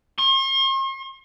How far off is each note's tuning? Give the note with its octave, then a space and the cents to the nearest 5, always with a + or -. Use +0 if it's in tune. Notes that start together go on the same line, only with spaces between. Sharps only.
C6 +45